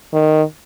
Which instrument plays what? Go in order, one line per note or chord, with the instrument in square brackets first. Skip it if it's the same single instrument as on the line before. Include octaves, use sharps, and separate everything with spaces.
[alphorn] D#3